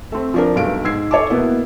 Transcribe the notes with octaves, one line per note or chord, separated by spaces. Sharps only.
A3 C4
F3 D4 A#4
B1 G2 A3 F5 D7
G#2 E6 G#6 C7
A4 C#5 A5 D6
B2 A#3 B3 E4